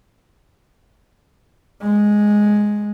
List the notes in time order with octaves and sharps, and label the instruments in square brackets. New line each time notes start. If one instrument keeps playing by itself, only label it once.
[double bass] G#3